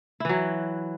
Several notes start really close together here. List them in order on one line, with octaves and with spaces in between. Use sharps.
E4 E3 F#3